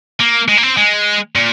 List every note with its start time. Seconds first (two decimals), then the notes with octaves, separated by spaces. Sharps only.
0.20 A#3
0.49 G#3
0.58 A#3
0.63 C4
0.78 G#3
1.35 A#2